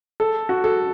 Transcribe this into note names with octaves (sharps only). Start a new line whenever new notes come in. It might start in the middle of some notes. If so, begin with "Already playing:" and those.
A4
F#4
A4